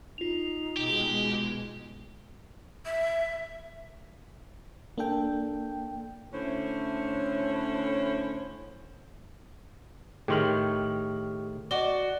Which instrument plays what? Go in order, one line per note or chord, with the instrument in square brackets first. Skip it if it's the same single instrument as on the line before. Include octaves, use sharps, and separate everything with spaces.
[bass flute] D#4 [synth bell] F4 F7
[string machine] B2 G#3 [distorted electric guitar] G4
[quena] E5
[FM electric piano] A#3 D4 A4 G5
[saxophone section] D3 A3 C#4 E4 C5 C#5
[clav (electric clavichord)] A2 D#3 [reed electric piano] G4 C#6 F6 [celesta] G#4 C6 F#7
[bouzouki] F#4 D5 [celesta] D#5 G7